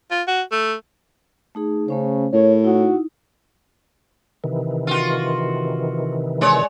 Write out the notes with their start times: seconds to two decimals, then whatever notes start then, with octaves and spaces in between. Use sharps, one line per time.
0.11 F4
0.28 F#4
0.51 A3
1.55 A3 D#4 G#4
1.88 C#3 A3 C#4 C5
2.33 A2 A#4 C#5
2.64 D#4 E4 F#4
4.44 C3 D#3 E3
4.87 F4 F#4
6.41 G#3 C#5 D5